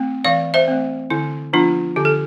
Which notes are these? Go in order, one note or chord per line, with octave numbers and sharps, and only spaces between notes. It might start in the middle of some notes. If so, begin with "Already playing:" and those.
Already playing: A3 C4
E3 D5 F5
C5 E5
A3 C4
D3 E4
F3 B3 D4 F4
D3 G4
A4